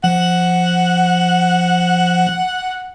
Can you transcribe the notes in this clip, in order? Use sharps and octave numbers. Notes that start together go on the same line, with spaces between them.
F3 F#5